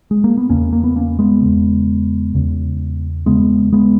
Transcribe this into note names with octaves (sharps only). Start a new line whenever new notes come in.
G#3
A#3
B3
E2 C#3 A#3 C#4
A#3
B3
A#3 C#4
G#3 B3
E2 C#3
E2 C#3
E2 C#3 G#3 B3
G#3 B3